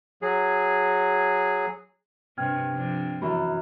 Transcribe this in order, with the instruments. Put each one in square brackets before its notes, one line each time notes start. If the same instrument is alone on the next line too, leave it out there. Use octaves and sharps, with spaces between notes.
[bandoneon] F#3 G#4
[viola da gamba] G2 C3 [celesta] G5 F6 G#6
[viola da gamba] C3 F3 D4
[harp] F#2 E3 [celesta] B5